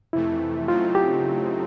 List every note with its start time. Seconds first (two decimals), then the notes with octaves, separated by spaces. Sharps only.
0.13 F2 C3 E3 A3 E4
0.68 C#3 F#3 A3 C4 D#4 F4
0.95 G4